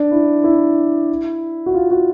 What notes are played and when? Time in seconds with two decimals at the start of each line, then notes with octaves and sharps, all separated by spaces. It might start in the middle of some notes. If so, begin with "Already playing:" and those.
Already playing: D4
0.11 E4
0.44 E4
1.66 F#4
1.74 F4
1.91 F#4